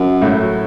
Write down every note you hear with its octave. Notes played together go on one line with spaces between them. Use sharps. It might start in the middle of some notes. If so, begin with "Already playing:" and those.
Already playing: F#2
A2 F#3 A3 E4